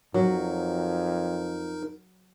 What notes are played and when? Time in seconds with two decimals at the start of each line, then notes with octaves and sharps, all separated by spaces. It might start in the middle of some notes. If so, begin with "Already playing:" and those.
0.14 F2 F#3 D#4 A#4